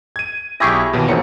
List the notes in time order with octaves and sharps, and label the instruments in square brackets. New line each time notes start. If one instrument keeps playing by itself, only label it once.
[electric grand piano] G#6 D#7
[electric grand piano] B1 C#6 A#6 [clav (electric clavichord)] E4 G4 G#4
[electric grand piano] D#2 B2 E3
[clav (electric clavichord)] A#1 F#2 [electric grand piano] C#7